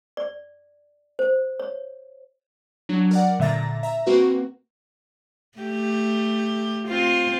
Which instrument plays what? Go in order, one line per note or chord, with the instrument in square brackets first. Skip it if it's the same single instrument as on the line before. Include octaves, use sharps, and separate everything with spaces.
[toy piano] D5
C5
C#5
[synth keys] F#3 D4
A#4 D5 F#5
A#2 D3 E5 A#5 A6 A#6
E5 A#5
A#3 C4 F#4 B4
[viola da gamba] A3 G4
C4 F4